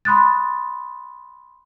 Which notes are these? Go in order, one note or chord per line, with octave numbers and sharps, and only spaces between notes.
B5 C6 D#6 F#6 A6